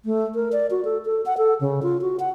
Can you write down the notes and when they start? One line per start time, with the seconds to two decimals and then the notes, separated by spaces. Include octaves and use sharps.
0.05 A3
0.35 A#4
0.52 D5
0.71 F#4
0.85 A4
1.05 A4
1.26 F#5
1.38 A4
1.61 C#3
1.82 F4
2.01 F#4
2.20 F#5